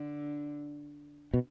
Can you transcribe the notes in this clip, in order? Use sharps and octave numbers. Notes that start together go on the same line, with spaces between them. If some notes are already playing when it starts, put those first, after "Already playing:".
Already playing: D3
B2